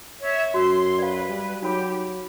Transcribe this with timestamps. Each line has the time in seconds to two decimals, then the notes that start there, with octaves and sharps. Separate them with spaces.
0.20 C#5 E5
0.54 F#2 F#4 C5 C6 E6
0.99 B4 D5 F5
1.29 G3
1.62 F#3 D#4 G4 A#4 B5